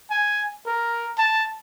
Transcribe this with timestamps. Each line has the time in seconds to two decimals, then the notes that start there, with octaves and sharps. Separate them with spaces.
0.10 G#5
0.66 A#4
1.18 A5